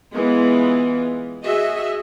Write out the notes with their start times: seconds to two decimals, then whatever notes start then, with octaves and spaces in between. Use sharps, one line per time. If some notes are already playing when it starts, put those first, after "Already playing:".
0.14 E3 G#3 B3 F4
1.44 F#4 G#4 D#5 E5